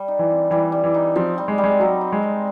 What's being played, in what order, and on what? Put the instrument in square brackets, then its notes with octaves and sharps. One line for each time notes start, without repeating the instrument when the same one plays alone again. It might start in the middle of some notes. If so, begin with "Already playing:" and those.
Already playing: [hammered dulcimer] G3
D#4
[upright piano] E3
[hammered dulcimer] C4
[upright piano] E3 [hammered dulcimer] G3
[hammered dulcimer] G3
[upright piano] E3
[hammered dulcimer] D#4
[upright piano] F3 [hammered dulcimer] C4
[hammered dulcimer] G3
[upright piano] G#3
[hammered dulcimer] G3
[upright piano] G#3
[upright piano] F#3 [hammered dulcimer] D#4
[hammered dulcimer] C4
[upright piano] G#3
[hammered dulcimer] G3